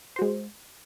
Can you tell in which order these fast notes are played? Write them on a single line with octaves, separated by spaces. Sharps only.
C5 F#4 G#3